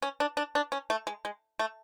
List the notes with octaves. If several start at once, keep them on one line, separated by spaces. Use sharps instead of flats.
C#4
D4
D4
D4
C#4
A3
G#3
G#3
A3